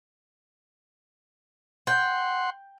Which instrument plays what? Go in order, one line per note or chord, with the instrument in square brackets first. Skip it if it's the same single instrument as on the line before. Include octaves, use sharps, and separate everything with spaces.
[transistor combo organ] F#5 C6 [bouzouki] G5